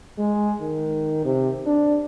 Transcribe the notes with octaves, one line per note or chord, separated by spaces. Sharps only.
G#3
D#3
C3
D4